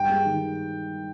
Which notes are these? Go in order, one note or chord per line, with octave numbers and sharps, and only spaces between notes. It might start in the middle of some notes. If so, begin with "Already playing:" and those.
Already playing: G2 G5
G#3
D#3